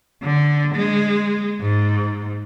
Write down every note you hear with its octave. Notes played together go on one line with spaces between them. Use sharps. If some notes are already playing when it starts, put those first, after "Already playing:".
D3
G#3
G#2